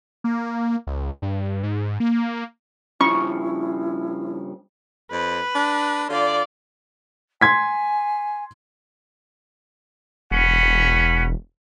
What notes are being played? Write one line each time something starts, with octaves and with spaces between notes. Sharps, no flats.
A#3
C#2
G2
G#2
A#3
G2 C#3 F3 C#4 E4 C#6
F2 B4
D4
D3 F4 D5
G#5 C6 G#6 B6
E1 C#4 F#5 B5